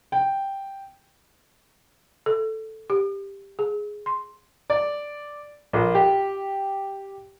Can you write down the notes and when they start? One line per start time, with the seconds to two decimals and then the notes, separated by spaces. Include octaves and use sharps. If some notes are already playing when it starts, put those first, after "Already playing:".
0.12 G5
2.26 A4
2.90 G4
3.59 G#4
4.06 C6
4.70 D5
5.73 A#1
5.95 G4